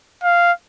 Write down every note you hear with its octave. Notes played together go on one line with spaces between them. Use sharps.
F5